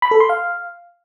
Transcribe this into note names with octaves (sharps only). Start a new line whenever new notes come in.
B5
A4
C6
F5